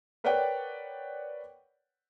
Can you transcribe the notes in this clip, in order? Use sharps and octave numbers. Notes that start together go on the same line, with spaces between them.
A#4 B4 C#5 D5 F#5 G5